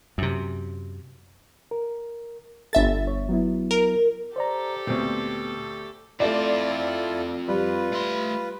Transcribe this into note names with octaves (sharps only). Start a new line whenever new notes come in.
F#2 C3
A#4
G1 A4 E5 A6
C#5
F#3 B3 E4
A#4
G4 A4 C5 D5 A#5
D2 A#2 B3 C4
F2 A3 C4 E4 F4 A4 D5
G3 F4 B4
A3 C6